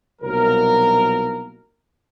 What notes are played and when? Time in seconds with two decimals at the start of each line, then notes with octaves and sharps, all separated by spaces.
0.22 C2 B2 F#3 A#3 D#4 A#4